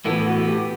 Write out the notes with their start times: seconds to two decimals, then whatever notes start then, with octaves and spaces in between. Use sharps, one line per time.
0.05 A2 E3 B3 A4
0.26 F#4
0.47 G4